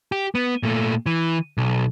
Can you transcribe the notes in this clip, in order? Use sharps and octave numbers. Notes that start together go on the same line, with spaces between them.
G4
B3
A#2 A3
E3
B1